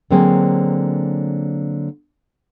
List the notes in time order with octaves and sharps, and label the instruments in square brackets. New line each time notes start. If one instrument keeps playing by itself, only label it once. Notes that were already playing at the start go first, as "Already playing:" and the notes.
[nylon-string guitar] D3 F#3 A#3 C4 G#4 C5